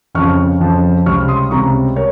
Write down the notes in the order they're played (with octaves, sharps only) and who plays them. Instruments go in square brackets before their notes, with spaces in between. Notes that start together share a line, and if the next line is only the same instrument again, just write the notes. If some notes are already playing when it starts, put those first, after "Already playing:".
[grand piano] F2 C#3 F3 C#6 F6
F2 C#3 F3
C#2 C3 G3 C4 C#6 F6
C6 D#6
C#2 C3 G3 C4 A#5 C#6
A#4 C#5